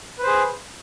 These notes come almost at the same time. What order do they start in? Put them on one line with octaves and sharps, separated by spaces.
B4 C5 G#4